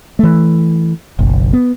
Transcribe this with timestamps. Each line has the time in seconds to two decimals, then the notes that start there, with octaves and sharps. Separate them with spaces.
0.19 E3 A3
1.19 F#1 B1
1.53 B3